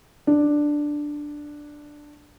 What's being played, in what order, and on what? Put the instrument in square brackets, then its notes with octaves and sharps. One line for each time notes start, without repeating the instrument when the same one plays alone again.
[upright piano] D4